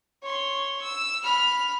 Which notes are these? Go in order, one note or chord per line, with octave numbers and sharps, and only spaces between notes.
C#5 C6
E6
B5 F6